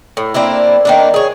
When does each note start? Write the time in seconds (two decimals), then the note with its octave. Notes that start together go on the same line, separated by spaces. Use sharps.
0.17 A2
0.34 A#3 C4 D4 E4
0.85 D#3 A#3 D4
1.14 G#4 C#5